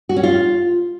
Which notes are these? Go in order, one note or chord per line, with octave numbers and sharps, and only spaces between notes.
F#4
C#4
F4